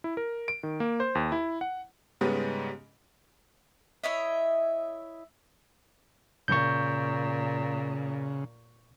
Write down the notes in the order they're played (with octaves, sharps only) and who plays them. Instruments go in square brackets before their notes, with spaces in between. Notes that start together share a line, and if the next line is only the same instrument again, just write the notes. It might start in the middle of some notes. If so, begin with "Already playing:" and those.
[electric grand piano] E4
A#4
D7
D#3
A#3
C5
D#2
E4
F#5
[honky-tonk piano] G#2 C#3 G3 G#3 B3 C#4
[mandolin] E4 C#5 D#5 E5
[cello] A#2 [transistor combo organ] C#3 [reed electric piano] C#6 G6